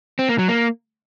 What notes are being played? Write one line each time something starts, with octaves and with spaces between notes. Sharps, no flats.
C4
A#3
F#3
A#3